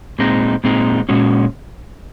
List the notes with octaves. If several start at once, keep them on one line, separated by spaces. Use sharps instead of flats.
A#2 G#3 C4 D#4
A#2 G#3 C4 D#4
A#2 G#3 C#4 F#4